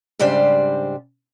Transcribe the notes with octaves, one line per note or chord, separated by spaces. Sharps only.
G#2 C#3 G3 D4 G4 C5